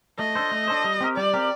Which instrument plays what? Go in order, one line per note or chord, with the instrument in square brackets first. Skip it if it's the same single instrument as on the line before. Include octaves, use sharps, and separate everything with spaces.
[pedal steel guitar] A3 [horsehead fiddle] D#5
[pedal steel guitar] D4 A4 C5
A3
D4 A4 C5
G3
C4 G4 A#4
[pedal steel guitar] G3 [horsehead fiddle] D5
[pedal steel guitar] C4 G4 A#4